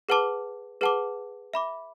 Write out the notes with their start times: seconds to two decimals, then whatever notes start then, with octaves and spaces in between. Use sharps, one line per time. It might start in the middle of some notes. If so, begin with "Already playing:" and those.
0.09 G#4 B4 F#5 A5 D6
0.81 G#4 B4 F#5 A5 D6
1.54 E5 B5 D6